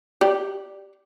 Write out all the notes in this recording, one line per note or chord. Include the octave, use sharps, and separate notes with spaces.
G4 D5